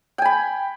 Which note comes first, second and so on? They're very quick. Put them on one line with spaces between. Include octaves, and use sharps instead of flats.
G5 G#5 B5